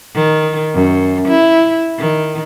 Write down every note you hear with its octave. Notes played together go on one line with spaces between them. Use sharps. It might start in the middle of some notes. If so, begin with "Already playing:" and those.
D#3
F#2
E4
D#3